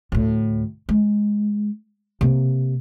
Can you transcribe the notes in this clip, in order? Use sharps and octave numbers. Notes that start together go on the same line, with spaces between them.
D2 A2
G#3
C3 A#3